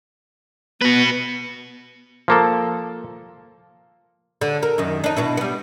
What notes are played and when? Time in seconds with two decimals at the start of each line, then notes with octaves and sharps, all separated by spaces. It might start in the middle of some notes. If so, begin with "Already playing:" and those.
0.81 B3 F#4 B4
2.28 F3 A#3 A4
4.41 D3
4.63 A#4
4.78 F#2 D#3
5.04 D4 D#4
5.16 B2 B3 E4
5.37 G3 B3